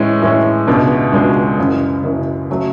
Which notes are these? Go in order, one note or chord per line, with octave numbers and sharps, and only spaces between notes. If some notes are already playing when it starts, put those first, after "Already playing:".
Already playing: A2 E3 G#3 C#4
A2 E3 G#3 C#4
C#2 B2 G#3 D4 F#4
C#2 B2 G#3 D4 F#4
F#1 F#2 C#3 E3
F#1 F#2 C#3 E3
C#3 F#3 A3